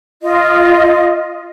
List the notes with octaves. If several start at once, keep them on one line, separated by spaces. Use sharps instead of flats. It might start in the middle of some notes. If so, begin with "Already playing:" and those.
F4 D#5